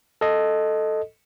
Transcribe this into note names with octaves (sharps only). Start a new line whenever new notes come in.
A4 D#5